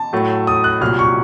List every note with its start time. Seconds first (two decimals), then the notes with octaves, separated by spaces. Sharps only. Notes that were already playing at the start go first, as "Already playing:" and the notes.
Already playing: A5
0.13 A2 F#3 A3
0.47 D#6
0.64 F#6
0.81 C2 A#2 F#3 F6
0.99 C#6